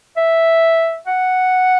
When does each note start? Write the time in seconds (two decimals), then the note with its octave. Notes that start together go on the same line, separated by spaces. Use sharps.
0.17 E5
1.07 F#5